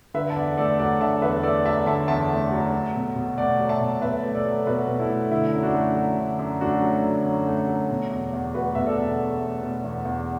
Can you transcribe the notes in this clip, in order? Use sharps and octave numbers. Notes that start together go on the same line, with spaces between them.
D3 B4 E5
A5
E2 D5 F#5
A3 A4 D5
F#3 D5 F#5
D3 E5 A5
E2 B4 E5
A3 A4 D5
F#3 E5 A5
D3 E5 A5
E2 E5 A5
A3
F#3
F#3
B2
B2
A3 D5 F#5
F#3
E5 A5
B2
B2 B4 E5
A3
A4 D5
F#3
B2 F#4 B4
B2
E4 A4
A3
D3 E4
F#2
D4 F#4
A3
F#3
D3
F#2
A3 D4 F#4
F#3
D3
F#2
A3
F#3
B2
E2
E2
A3 F#4 B4
B2 E5
A4 D5
E2
E2
A3
B2
E2
E2